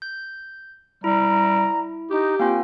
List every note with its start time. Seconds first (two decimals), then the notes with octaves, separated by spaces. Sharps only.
0.02 G6
1.04 G3 E4 A#5
2.11 D#4 G4
2.40 A#3 C4 F4 G#5